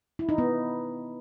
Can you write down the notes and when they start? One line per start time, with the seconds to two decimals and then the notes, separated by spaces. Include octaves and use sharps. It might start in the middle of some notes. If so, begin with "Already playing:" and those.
0.19 E4
0.29 D#4
0.38 B3